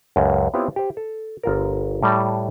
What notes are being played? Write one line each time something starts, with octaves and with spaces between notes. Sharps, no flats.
C#2 F#2
B3 C4 E4 F4 G4 C#5
G4 C5
A4
G1 F4 A#4
A2 G3 A4 D5 A#5